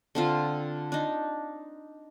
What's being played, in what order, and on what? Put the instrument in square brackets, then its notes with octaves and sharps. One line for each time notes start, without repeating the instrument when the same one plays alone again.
[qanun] D3 C4 F4
D4 D#4